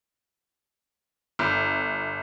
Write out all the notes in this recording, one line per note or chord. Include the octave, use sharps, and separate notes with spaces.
G1